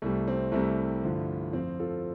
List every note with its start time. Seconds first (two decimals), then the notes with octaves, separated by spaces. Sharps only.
0.02 C2 C3 G3 A3
0.28 C4
0.52 C2 C3 G3 A3
1.04 G2 D3 F3
1.53 F2 F3 C4
1.80 F4 A4